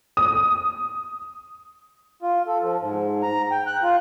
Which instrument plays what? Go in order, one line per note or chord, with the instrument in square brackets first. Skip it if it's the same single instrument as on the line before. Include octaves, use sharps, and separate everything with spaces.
[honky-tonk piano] D#6
[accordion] F4
A4
F3
G#2
A#5
G5
F#6
F4